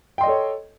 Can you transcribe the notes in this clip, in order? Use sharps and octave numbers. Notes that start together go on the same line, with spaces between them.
A4 C#5 D#5 G5 C6